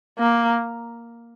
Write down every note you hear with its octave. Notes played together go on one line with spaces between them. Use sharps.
A#3